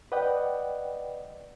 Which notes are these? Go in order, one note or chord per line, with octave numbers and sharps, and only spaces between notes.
B4 D5 D#5 F#5 G5